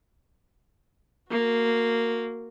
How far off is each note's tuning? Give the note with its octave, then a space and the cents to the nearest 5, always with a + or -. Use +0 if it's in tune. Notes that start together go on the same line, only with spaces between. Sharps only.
A#3 -10 F#4 -20